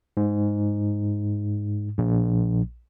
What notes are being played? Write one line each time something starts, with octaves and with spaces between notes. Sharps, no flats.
G#2
A#1